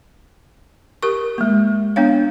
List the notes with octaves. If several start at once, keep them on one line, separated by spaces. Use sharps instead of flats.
G4 A#4 C#6
G#3 A#3
B3 D4 C#5 F5